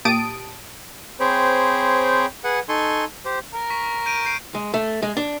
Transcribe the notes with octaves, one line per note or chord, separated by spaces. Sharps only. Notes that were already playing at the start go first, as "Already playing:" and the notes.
A#2 G4 A5 D#6 A6 D7
C4 G#4 C5 C#5 G5 B5
G#4 B4 F#5 G#5
D#4 A4 G#5 C6 C#6
G4 C5
A#4
C#6 B6
G6 D7 D#7
G6 C7 D7
G#3
A3
G#3
D4